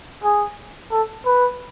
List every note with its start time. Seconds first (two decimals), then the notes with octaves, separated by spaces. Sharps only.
0.24 G#4
0.92 A4
1.26 B4